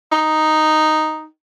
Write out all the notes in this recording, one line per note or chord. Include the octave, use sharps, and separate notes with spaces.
D#4